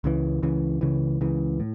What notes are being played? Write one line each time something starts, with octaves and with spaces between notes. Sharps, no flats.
C#2 C#3 E3
C#2 C#3 E3
C#2 C#3 E3
C#2 C#3 E3
A2